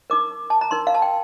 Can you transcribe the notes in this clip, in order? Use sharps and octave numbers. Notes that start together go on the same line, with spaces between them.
D#4 A#4 D6
A5
A#5
D#4 A#4 C6
F5
A5
G5